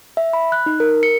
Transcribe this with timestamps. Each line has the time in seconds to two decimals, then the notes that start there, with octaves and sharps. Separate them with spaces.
0.17 E5
0.33 B5
0.52 F#6
0.66 D#4
0.80 A#4
1.03 C#7